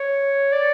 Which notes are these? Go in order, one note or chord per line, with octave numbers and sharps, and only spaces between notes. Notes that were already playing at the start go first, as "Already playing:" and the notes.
Already playing: C#5
D5